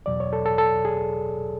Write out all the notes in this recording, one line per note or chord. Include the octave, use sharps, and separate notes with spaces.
E2 B2 F#3 D5
C#5
A4
A4
A4
G#4